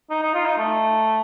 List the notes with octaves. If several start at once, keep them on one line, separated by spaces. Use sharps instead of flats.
D#4
D#4
F4
D#4
A3